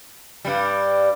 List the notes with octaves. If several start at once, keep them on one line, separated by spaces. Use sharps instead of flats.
G2 G3